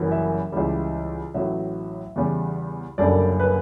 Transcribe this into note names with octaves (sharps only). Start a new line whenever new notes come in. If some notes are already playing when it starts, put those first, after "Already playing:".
Already playing: F#1 F#2 E3 G3
E5
C#2 C#3 E3 G3
A1 A2 F#3 E5
E2 C#3 G3
F#1 F#2 D3 G3 D5
B4